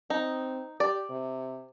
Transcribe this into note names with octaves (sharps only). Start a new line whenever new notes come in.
C4 D#4
G4 D5
C3